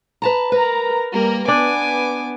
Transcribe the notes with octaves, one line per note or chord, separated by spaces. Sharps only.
B4 A5 A#5
A#4 B4 A#5
G3 A#3 A#4
B3 D4 G#5 D6